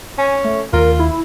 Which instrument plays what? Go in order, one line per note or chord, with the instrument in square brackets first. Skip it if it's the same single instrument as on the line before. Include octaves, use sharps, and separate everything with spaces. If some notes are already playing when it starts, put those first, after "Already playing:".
[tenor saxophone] C#4 [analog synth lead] G#5
[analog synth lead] A3
[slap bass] D#2 A3 [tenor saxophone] F4 [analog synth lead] A#4
[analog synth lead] E4